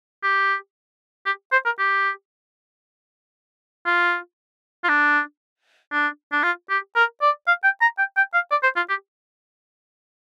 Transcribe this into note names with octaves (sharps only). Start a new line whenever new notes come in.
G4
G4
C5
A#4
G4
F4
F4
D4
D4
D4
F4
G4
A#4
D5
F5
G5
A#5
G5
G5
F5
D5
C5
F4
G4